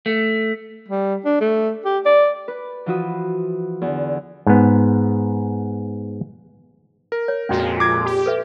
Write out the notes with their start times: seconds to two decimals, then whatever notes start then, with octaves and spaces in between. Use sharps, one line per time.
0.06 A3
0.88 G3
1.25 D4
1.41 A3
1.85 G4
2.06 D5
2.48 B4
2.86 E3 F3 F4 F#4 B5 D#6
3.82 E2 D3
4.46 G#2 B3
7.12 A#4
7.28 C#5
7.49 F2 A#2 G#3 C#4 D4 F#4
7.80 D6 G#6
8.06 G4
8.26 A4 B4 E5